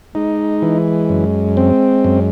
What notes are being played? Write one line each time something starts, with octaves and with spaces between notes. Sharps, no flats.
G#3 D#4
E3
F#2
C4
F#2